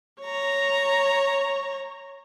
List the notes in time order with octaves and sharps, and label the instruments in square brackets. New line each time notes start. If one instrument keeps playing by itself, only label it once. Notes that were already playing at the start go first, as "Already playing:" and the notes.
[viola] C#5 A#5